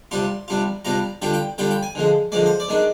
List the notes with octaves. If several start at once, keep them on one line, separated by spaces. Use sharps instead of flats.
C3 G3 D4 F4 C6
C3 G3 D4 F4
C3 G3 D4 F4 A#5
D3 G3 D4 F4 G5
G5
D3 G3 D4 F4 G5
G5
G#5
D3 F3 G#3
D3 F3 G#3 D5
C5
D5
D#3 G#3 D4